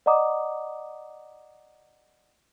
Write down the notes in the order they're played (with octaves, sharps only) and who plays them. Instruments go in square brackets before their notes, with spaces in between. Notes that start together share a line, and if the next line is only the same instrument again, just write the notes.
[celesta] D5 D#5 F#5 A#5 D6 D#6